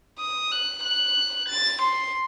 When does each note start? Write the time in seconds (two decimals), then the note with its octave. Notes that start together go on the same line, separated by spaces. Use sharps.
0.19 D#6
0.52 F#6
0.84 F#6
1.49 A6
1.82 C6